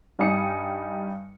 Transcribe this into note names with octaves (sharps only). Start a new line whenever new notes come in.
G2 G3 D#4 G#5 D#6 C#7